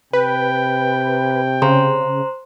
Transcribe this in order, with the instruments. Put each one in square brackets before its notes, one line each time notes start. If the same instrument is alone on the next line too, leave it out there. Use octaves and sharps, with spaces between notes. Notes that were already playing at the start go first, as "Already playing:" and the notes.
[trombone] C3 [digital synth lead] B4 [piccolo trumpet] G5
[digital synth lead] C#3 [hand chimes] C5 A#5 C6